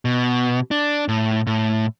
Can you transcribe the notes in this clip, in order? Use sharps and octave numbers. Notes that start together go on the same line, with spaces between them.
B2
D4
A2
A2